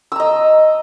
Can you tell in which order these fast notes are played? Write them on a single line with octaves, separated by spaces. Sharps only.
E6 A#5 D#5